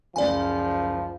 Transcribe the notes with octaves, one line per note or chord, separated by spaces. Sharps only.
F#1 C#2 F3 D5 G#5